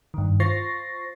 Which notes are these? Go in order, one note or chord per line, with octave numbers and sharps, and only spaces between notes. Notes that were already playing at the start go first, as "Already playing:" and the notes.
G2 D#3
F4 C5 C#6 A6 A#6 C7